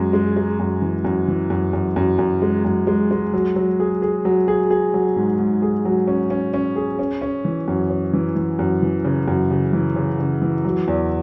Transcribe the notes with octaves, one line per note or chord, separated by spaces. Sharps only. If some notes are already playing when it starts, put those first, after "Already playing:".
Already playing: F#2 G#3
G#3
G#3
F#2
E3
F#2
E3
F#2
F#2
F#2
F#2
G#3
F#2
G#3
G#3
F#3
F#3
G#4
G#4
F#3
G#4
G#4
F#3
G#2
G#2
G#4
F#3
C#4
C#4
C#4
G#4
C#4
C#4
E3
F#2
C#4
E3
E3
F#2
E3
C#3
F#2
C#3
E3
C#3
C#3
E3
F#3
E2